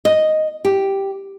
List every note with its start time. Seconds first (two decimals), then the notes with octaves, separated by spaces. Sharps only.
0.05 D#5
0.65 G4